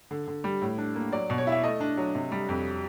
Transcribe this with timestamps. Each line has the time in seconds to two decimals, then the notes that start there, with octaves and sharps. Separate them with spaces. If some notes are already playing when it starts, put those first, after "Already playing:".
0.11 D3
0.27 D3
0.44 G3
0.62 A2
0.78 D4
0.96 A#3
1.13 F#3 D5
1.30 B2
1.38 C#5
1.47 E4 E5
1.63 A3 D#5
1.80 D4
1.97 F#3
2.15 C3
2.32 G3
2.49 F2